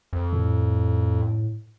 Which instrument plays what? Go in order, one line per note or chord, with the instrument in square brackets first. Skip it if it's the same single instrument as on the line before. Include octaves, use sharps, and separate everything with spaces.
[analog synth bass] F2
[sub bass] A2